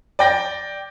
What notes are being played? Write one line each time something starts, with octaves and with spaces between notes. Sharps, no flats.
D5 G5 A#6